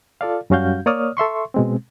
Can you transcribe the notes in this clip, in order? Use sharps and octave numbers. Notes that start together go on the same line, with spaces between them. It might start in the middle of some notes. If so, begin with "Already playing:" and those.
F4 A4 D5 F5
F#2 G3 C#4 F#4 F5 G6
A#3 C#5 D5 D#6 F6
A4 E5 C6 C#6
B2 G#3 C4